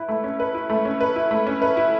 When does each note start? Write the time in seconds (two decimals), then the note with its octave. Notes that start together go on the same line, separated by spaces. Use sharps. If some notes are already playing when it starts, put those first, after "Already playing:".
Already playing: E4 B4
0.08 A3
0.24 C#4
0.40 B4
0.54 E4
0.70 A3
0.85 C#4
1.01 B4
1.16 E4
1.31 A3
1.47 C#4
1.62 B4
1.77 E4